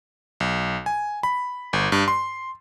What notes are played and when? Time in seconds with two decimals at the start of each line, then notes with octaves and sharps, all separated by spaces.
0.40 B1
0.86 G#5
1.23 B5
1.73 G1
1.92 G2
2.08 C6